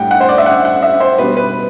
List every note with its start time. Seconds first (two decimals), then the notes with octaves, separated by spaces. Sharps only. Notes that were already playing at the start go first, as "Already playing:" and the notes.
Already playing: A2 G3 F#5 G5
0.11 F#5
0.21 C5
0.29 D5
0.38 E5
0.46 F#5
0.65 F#5
0.83 E5
1.00 C5
1.18 B2 G3 B4
1.37 B4